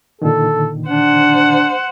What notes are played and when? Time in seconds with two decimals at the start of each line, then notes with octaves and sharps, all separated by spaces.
0.22 A#2 D3 D#3 A4
0.89 D4 C5 F#5